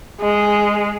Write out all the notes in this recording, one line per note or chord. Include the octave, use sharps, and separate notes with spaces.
G#3